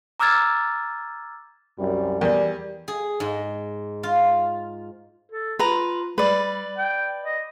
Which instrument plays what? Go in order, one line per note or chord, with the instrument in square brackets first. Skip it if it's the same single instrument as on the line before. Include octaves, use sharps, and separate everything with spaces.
[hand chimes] A#5 D6 E6 F6 G#6 A6
[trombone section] C2 F#2 [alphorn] G3
[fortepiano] E2 [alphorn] G3 [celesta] A#4 D5
[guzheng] G#4
G#2
F4
[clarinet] A4
[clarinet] F4 [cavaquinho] B4 A#5
[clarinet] G3 [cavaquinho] B4 D5
[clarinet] G5
D#5